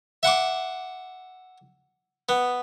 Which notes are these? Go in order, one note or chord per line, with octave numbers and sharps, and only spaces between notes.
E5 F#5 C6 D6
B3